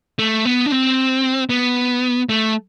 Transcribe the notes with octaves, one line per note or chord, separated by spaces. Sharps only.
A3
B3
D4
C4
B3
A3